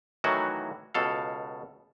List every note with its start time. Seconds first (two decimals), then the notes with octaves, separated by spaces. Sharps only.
0.24 A2 D#3 E3 F#3 F#4
0.94 C#2 B2 A4 F5